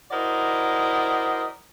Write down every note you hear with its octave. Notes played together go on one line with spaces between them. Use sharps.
E4 F#4 A#4 C5 D5 D#5